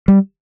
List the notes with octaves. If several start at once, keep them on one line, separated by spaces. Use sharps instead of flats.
G3